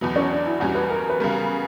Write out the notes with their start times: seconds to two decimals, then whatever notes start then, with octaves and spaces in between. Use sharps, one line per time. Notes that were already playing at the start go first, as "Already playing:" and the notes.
0.01 E2 B2 F#3 B3
0.16 C#4
0.31 D4
0.46 E4
0.60 E2 B2 G3 C#4 F#4
0.75 B4
0.90 A#4
1.10 B4
1.20 C#3 G3 B3 A#4